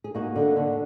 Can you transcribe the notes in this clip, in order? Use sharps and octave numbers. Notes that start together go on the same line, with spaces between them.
G#4
A#3 D#4 F#4
D3
D3